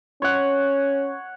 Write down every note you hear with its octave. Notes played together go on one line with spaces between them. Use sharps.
C#4 C#5 F#5